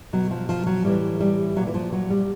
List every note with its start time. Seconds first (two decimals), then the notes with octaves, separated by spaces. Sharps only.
0.13 B2 F#3
0.31 F3
0.49 F3
0.66 F#3
0.84 A2 E3 G3
1.20 G3
1.56 A#2 F#3
1.67 E3
1.74 F3
1.92 F#3
2.10 G3